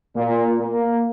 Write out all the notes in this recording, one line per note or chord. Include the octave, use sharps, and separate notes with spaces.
A#2
A#3